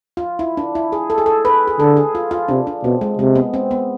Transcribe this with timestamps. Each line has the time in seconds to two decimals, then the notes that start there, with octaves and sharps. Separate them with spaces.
0.17 F4
0.39 E4
0.57 D4
0.75 E4
0.92 G#4
1.10 A4
1.18 G#4
1.26 A4
1.45 B4
1.68 G#4
1.80 D3 A4
1.97 G#4
2.15 F4
2.31 F4
2.48 C3 D4
2.67 D4
2.84 B2 C4
3.01 G#3
3.18 C3 G#3
3.36 B3
3.54 C4
3.71 B3